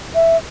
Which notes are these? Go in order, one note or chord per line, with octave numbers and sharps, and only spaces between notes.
E5